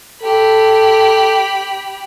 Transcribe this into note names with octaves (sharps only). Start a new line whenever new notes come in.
G4 A4 B5